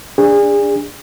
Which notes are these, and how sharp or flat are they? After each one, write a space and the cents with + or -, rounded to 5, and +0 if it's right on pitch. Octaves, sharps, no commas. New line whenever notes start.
D4 +0 G#4 -30